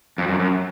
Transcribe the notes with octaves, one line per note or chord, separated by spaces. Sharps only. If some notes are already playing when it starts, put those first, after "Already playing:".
F2
F#2
F#2